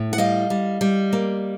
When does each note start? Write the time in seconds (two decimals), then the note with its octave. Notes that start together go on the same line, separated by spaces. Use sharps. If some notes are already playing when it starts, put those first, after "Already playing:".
Already playing: A2
0.13 F#5
0.18 G3 D#5 F5
0.50 G3
0.81 G3
1.13 A#3